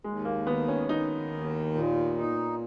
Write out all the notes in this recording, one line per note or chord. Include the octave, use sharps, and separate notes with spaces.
D#2 G#3
A#3
D#3 B3
C#4
D#3 D#4
D#2
A#2
D#4